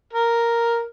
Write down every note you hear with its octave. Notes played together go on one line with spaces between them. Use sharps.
A#4